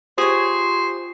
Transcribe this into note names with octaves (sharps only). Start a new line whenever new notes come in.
F4 G4 G#4 C5 C#5